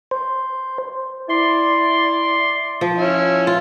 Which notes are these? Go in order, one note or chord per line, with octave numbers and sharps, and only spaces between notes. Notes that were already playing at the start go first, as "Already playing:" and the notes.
C5
E4 D5 C6
F3
C#4 E4
F4